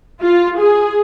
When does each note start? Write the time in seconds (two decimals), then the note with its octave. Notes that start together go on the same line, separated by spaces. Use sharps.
0.21 F4
0.59 G#4